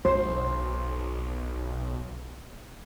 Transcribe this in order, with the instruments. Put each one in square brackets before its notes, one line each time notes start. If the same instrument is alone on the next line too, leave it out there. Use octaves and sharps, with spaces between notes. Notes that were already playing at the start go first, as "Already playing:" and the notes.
[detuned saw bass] B1 [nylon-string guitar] C5